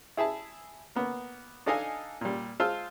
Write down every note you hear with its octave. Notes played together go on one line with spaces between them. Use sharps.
E4 G#4 E5 A5
A#3 B3
D4 D#4 A4 D#5 F5 G#5
A#2 G3
G#3 F4 C5 F5 A5 E6